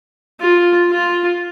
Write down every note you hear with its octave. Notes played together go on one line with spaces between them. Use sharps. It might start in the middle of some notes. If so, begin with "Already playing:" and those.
F4
F4